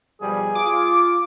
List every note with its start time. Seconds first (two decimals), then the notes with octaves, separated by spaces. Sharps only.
0.21 B2 F3 G3 G#4
0.55 F4 D6